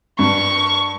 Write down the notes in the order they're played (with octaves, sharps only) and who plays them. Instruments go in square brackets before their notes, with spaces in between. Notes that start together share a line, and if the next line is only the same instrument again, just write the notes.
[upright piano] G2 [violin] C#6